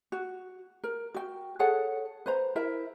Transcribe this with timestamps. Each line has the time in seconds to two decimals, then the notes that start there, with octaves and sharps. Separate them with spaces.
0.12 F#4
0.84 A#4
1.14 F#4 G5
1.59 G#4 A4 C#5 F#5
2.26 B4 C5 A#5
2.56 E4 A#4 E5